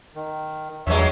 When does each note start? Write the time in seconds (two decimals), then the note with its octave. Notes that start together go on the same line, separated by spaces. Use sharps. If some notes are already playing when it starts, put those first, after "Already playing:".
0.15 D#3
0.87 E2 G2 F3 F#3 G#3 C#5 E5